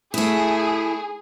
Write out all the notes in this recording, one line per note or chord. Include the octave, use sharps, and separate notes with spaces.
A3 E4 G#4